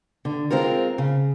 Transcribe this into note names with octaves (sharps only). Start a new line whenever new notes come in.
D3
G#3 C4 F4 A#4
C#3